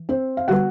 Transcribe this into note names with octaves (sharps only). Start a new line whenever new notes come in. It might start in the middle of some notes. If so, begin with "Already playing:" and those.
Already playing: E3
C4 C5
F5
D3 G3 B3 F#4 F#5